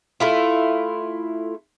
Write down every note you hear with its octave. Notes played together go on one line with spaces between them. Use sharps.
A3 E4 F4